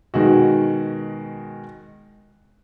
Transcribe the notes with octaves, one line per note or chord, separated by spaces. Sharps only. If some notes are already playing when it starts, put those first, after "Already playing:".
B2 D#3 G#3 F#4